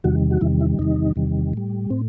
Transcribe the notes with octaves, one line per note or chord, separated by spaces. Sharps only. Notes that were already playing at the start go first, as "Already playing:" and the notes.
E2 C3 D#3 G3 F#4
F#4
E2 C3 D#3 G3 E4
E4
E2 C3 D#3 G3 D#4
E2 C3 D#3 G3
A2 G3
A2 C4